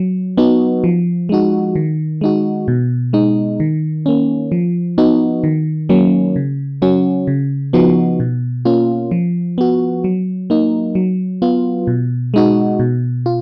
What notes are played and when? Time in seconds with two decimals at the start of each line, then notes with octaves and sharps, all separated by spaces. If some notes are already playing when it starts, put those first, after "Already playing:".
Already playing: F#3
0.37 B3 D#4 F#4
0.84 F3
1.29 G#3 D#4 F#4
1.76 D#3
2.21 G#3 D#4 F#4
2.68 B2
3.13 G#3 D#4
3.60 D#3
4.06 A#3 C#4
4.52 F3
4.98 B3 D#4 F#4
5.44 D#3
5.89 F#3 A#3 C#4
6.36 C#3
6.82 F#3 C#4 F#4
7.27 C#3
7.73 F3 B3 D#4 F#4
8.20 B2
8.65 A#3 C#4 F4
9.11 F3
9.58 B3 F#4
10.04 F#3
10.50 A#3 D#4
10.95 F#3
11.42 B3 F4
11.87 B2
12.34 G#3 D#4 F#4
12.80 B2
13.26 F4